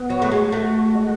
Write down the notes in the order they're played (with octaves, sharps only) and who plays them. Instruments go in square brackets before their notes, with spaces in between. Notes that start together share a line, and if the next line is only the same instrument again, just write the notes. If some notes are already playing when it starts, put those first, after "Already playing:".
Already playing: [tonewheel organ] B3
[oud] F#3 [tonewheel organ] F#4
[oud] A3
G#3
[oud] A3 [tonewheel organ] F#4
[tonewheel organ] G#3